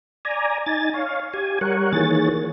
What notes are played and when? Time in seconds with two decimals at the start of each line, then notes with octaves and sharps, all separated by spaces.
0.25 D5 G#5 A#5
0.66 D#4 G#5 A6
0.94 C#5 F5
1.34 G4 G#5
1.61 G3 A#4 C#5 F#5
1.93 D#3 E3 A#3 G#4 C#5 A6